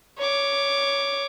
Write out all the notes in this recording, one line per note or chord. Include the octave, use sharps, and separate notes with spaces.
C#5 D6